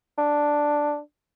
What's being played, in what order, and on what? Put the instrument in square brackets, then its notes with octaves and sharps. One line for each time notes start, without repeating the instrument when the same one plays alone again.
[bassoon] D4